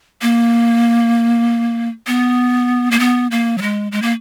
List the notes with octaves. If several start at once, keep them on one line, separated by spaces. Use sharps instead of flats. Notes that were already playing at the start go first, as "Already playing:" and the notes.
A#3
B3
A#3
B3
A#3
F#3
G#3
G#3
A#3